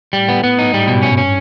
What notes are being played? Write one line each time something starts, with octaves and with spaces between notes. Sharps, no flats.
A2 G3
B3
B3
G#2 D#4
G3
B2
G2 C#4
C#4